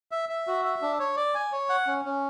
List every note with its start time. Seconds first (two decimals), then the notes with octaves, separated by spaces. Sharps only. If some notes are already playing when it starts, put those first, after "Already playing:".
0.11 E5
0.29 E5
0.47 F#4
0.65 E5
0.82 D4
0.99 C#5
1.17 D5
1.34 G#5
1.52 C#5
1.69 F#5
1.87 C#4
2.05 C#4